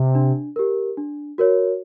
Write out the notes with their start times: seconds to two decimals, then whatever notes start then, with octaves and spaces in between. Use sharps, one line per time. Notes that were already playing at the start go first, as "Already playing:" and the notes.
Already playing: C3
0.15 D4
0.56 G4 A#4
0.98 D4
1.38 F#4 A#4 C#5